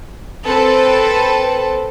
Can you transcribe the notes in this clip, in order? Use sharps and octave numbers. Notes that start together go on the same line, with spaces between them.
C4 A4 B4